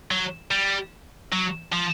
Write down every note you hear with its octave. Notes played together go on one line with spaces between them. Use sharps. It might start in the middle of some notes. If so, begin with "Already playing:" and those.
F#3
G3
F#3
F3